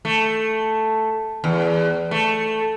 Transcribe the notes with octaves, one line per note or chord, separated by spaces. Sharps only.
A3
E2
A3